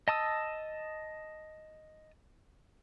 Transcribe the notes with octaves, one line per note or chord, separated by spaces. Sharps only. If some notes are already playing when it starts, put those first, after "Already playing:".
D#5 A5 D#6 E6